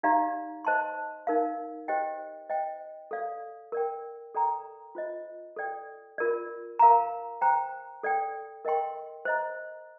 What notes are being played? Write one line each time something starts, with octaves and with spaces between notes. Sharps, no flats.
D#4 G4 D5 F5 A#5
C5 D#5 A5 C6
D#4 A#4 F5
G4 C5 D#5 G5
C5 D#5 G5
A4 D5 F5
A#4 D5 G5
A4 D5 G5 A#5
F4 C5 D#5
A4 D5 G5
F4 A#4 D5
A#4 F5 A#5
C5 G5 A#5
A4 D5 G5
A#4 D#5 G5 C6
C5 D#5 A#5